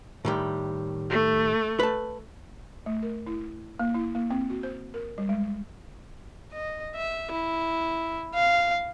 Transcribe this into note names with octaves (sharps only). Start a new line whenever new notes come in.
A2 D#3 G3
A3
B4 A5
A3
A#4
E4
A#3
E4
A#3
C4
F#4
C5
A#4
G3
G#3
D#5
E5
E4
F5